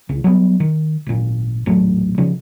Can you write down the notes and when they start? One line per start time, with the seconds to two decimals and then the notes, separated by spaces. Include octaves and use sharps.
0.09 C2 C#3
0.24 F#3 G3 A3 B3
0.60 D#3
1.07 G#1 A#2
1.66 D#1 A1 F#3 A3
2.18 C#3 F3